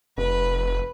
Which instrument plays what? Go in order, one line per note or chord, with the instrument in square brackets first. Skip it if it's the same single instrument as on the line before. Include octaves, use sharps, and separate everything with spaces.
[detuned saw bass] F1 [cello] B4